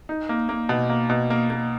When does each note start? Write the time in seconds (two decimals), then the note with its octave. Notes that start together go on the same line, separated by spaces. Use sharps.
0.09 D#4
0.29 A#3
0.49 A#3
0.69 B2
0.90 A#3
1.10 B2
1.30 A#3
1.50 A#3